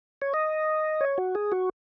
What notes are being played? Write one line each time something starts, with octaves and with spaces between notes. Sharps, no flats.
C#5
D#5
C#5
F#4
G#4
F#4